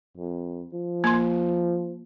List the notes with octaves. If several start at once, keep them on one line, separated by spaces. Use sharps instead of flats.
F2
F3
A#3 C6